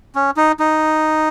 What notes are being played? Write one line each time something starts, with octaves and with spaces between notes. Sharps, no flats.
C#4
D#4
D#4